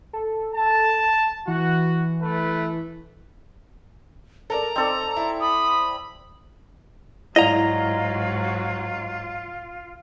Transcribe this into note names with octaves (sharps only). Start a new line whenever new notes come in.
A4
A5
E3 F#4
A3 B4
A4 A#4 D5 A#5
C4 D#4 A4 D5
E4
B5 D#6
G#2 F#3 E4 F4 D5 D#5 F5 A#5